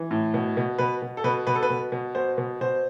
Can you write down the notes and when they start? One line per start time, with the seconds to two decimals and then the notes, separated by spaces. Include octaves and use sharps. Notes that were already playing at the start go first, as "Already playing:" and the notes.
Already playing: E3
0.11 A2
0.34 B2
0.57 B2
0.78 B2 B4
1.02 B2
1.17 A4
1.24 B2 B4
1.47 B2 B4
1.55 A4
1.63 B4
1.70 B2
1.92 B2
2.15 B2 C5
2.38 B2
2.61 B2 C5